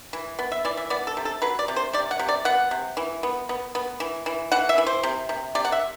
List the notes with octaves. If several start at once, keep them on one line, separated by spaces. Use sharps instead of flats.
E3
B3
E5
E3 D5
E5
B3 D5
A4
C3
A4
F#3 B4
D5
C3
C5
C3 D5
F#5
C3
D5
B3 F#5
C3
E3
B3
B3
B3
E3
E3
E3 F#5
E5
E3
C5
C3
C3
C3 D5
F#5
E5